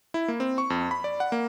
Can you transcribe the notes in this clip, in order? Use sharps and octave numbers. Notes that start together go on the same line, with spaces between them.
E4
A#3
C4
C#6
F2
B5
D5
F#5
A#3